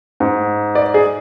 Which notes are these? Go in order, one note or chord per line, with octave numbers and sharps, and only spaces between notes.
G#2
D5
G#4